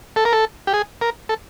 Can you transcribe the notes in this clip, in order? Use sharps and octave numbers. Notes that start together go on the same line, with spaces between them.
A4
A#4
A4
G4
G#4
A#4
A4